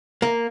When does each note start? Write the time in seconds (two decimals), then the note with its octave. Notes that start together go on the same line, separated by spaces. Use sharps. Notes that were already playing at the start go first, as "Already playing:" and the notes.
0.22 A#3